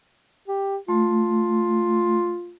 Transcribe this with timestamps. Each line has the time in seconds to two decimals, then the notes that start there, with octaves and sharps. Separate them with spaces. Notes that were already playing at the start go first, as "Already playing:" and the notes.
0.48 G4
0.88 A3 F4